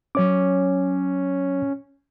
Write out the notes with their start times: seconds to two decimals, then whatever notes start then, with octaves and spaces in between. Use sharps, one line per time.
0.15 F#3 C#4 C#5 D6